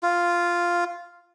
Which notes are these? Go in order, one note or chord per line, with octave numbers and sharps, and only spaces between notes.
F4